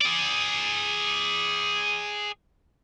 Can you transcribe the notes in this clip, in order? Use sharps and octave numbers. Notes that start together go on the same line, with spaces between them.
G#4 D5